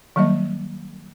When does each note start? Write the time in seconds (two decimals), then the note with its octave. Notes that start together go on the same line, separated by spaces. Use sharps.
0.16 D#3 F#3 G3 A#3 D#5